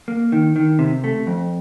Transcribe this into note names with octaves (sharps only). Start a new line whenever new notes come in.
A#3
D#3
D#3
C3
A3
F2